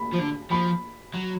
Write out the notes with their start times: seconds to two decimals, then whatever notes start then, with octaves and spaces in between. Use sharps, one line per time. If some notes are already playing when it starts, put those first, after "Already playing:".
Already playing: B5
0.13 F3
0.19 D3
0.51 F3 B5
1.14 F#3